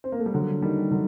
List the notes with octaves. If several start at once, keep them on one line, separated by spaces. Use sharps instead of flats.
C4
A#3
A3
G3
D3 F#3
D#3 G3
D3 F#3